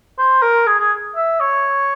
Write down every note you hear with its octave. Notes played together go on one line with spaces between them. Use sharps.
C5
A#4
G#4
G#4
E5
C#5